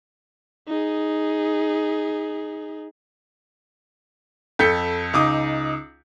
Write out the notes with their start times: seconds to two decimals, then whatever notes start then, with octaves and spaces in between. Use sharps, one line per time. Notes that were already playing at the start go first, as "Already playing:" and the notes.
0.68 D#4 G#4
4.59 F2 A4 G6 B6 C#7
5.13 C#2 D#4 D6 D#6